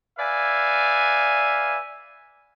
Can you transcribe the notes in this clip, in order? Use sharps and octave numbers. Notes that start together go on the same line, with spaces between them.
B4 D5 E5 F5 G#5